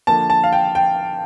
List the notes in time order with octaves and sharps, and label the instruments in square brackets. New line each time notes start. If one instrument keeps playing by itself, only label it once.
[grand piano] D3 F3 A#3 A5
A5
F5
G5
G5